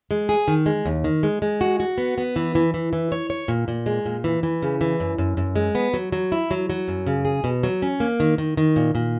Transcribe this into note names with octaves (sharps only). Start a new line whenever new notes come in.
G#3
G#4
D#3
G#3
D#2
D#3
G#3
G#3
F#4
F#4
B3
B3
E3
E3
E3
E3
C#5
C#5
A#2
A#2
G#3
A#2
E3
E3
C#3
E3
F#2
F#2
F#2
G#3
B3
F#3
F#3
E4
F#3
F#3
F#2
C#3
G#4
B2
F#3
C#4
A#3
D#3
D#3
D#3
A#2
A#2